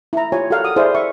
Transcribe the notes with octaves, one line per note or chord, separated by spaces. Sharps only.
E4 A#5
F4 G4 C#5 G#5
F#4 G4 A4 A#4 F5 F#5
D#6
E4 G#4 C5 D5 F5
E5 C#6